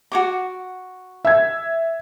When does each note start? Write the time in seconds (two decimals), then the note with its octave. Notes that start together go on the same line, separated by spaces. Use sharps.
0.12 F#4 A4 D6
1.25 E5 E6 G#6